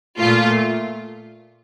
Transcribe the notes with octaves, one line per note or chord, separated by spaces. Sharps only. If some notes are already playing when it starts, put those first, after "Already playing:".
A#2 A3 F4